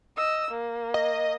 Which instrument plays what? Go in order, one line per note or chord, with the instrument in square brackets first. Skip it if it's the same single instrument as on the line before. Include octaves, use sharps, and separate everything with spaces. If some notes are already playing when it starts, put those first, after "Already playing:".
[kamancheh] D#5 E6
A#3
[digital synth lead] D#5